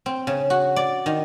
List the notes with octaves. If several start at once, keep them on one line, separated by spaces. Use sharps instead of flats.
C4
C#3
F#4
D5
D#3